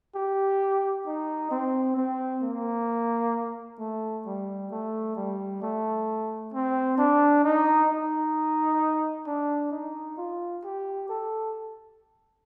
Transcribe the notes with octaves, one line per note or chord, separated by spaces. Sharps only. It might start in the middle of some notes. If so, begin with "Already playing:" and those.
G4
D#4
C4
C4
A#3
A3
G3
A3
G3
A3
C4
D4
D#4
D#4
D4
D#4
F4
G4
A4